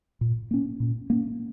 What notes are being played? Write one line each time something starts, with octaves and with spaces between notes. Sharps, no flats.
A#2
A#3 C#4
A#2
A#3 C#4